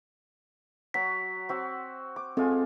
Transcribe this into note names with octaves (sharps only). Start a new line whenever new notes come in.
F#3 F#4 C#5 B6
C4 F#4
D6
G#3 C4 F4 A4 G#5